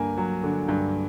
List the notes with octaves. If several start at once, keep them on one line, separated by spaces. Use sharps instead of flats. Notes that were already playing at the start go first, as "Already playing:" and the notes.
Already playing: G2 D3 A#3 G#5
F#3
D3
G2